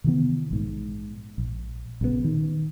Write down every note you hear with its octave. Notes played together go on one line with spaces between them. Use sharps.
C3 D#3 E3 B3
A#1 G#2
A#1
A#1 C#3 F3 B3
D#3